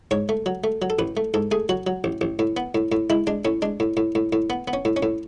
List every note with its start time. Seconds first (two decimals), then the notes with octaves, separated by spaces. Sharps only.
0.11 G#2 C#5
0.29 A3
0.46 F#3
0.64 A3
0.82 F#3
0.90 A4
0.99 A1 B4
1.17 A3
1.34 G#2 A4
1.51 A3 G#4
1.69 F#3 F#4
1.87 F#3
2.04 A1
2.21 A1
2.39 A2
2.57 B3
2.75 A2
2.92 A2
3.10 G#3 E4
3.27 G#3 D4
3.45 A2 C#4
3.62 G#3 D4
3.80 A2
3.97 A2
4.15 A2
4.33 A2
4.50 B3
4.68 B3
4.73 C#4
4.85 A2
4.96 C#4
5.03 A2